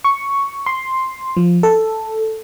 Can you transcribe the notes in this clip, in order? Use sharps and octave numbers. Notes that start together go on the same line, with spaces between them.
C#6
C6
F3
A4